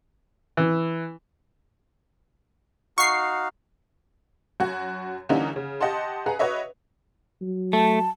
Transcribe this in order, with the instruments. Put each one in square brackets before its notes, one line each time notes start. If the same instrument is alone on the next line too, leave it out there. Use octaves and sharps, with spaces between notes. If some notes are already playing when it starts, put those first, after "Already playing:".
[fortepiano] E3
[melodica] D#4 F#4 F5 [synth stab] C#6 C7
[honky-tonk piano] F#2 F#4 G#6
D3 E3 G3 A#3 C#4 D#4
C#3
G4 D#5 F#5 A5 C6
G#4 B4 F#5 A#5
F#4 B4 C#5 D#5 E5
[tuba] F#3
[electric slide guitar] A3 [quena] A5